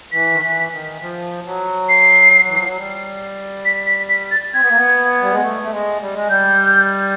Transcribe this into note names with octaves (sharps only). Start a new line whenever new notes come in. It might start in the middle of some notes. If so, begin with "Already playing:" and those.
E3 B6
D#3
E3
D#3
F3
F#3
C7
E3
F3
F#3
G3
B6
B6
B6
A6
C4 G#6
B3
A#3
B3
G3
G#3
A3
A3
G#3
G3
G#3
G3 G6